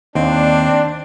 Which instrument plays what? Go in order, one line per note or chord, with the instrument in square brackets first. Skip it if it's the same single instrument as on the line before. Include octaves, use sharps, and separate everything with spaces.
[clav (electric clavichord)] D#2 [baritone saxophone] C4 [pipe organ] D4